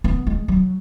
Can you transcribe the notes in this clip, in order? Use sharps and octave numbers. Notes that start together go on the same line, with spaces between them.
B3
G#3
F#3